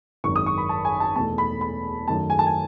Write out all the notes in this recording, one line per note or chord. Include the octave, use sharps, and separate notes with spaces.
G#1 F#2 D#3 C#6
D#6
C#6
B5
A5
G#5
A5
E2 B2 A3 A5
B5
B5
F#2 D#3 F#3 A3 A5
G#5
A5
G#5